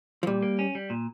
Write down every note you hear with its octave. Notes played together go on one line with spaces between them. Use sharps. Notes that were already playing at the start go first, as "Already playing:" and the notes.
F3
A#2 G3
A#3
C#4
G3
A#2